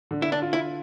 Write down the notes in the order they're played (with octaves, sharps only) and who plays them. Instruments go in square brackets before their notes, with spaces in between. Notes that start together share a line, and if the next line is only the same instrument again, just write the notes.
[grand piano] D3
[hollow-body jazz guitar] E4
D4
[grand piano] F4
[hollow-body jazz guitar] E4